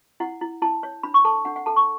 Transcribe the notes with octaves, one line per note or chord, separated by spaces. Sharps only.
E4 F#5
E4
E4 A5
C#5
D4 B5
C#6
A4 A5
D4 F#5
F#5
A4 A5
C#6